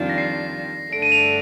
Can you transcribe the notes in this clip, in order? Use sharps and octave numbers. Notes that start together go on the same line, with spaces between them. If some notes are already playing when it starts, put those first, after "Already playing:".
Already playing: F2 D#3 G3 D4 F4
A#6
C7
G2 D3 A3 D4 D7
D#7
F7